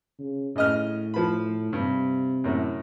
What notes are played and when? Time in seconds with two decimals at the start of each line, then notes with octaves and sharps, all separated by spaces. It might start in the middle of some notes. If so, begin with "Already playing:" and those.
0.19 C#3
0.56 A2 C#3 D#5 F6
1.14 F3 B5
1.73 G2 C3
2.44 F#2 A2